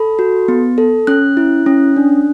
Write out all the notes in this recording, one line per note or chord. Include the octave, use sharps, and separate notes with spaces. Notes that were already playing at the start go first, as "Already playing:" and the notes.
Already playing: A4 B5
F#4
B3
A4
C#4 F#6
E4
C#4
D4